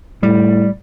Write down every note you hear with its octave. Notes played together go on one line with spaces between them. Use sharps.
A2 G3